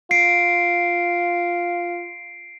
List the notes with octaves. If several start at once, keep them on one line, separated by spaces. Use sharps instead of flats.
F4 C7 D7